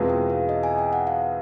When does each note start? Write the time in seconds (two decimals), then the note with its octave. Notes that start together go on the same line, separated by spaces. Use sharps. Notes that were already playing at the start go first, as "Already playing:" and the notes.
Already playing: E2 B2 G#3 C4 F4
0.09 G5
0.30 F5
0.49 D#5
0.63 G#5
0.78 G5
0.93 F#5
1.07 F5